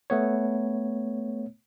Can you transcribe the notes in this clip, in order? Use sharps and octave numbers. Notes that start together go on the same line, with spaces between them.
A3 B3 C#5